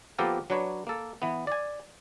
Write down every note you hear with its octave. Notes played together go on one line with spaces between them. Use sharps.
F3 A#3 B3 G4 A4 A#4
F#3 D4 B4 C#5
A#3 A4
E3 B3
D5 G#5